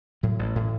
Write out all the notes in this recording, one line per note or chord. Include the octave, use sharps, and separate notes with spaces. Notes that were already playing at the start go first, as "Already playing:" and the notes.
A2 F#3
A1
A2